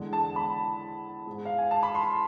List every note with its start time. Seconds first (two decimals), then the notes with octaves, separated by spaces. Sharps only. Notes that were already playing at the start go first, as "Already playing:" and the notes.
Already playing: E2 D3 G#3
0.13 A5
0.36 B5
1.26 G#2 G#3
1.45 F5
1.58 G#5
1.71 A5
1.83 B5
1.95 C6